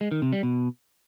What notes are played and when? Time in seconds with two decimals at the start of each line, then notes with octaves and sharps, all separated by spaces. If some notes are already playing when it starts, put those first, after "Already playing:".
0.01 G#3
0.11 D#3
0.22 C3
0.33 G3
0.43 B2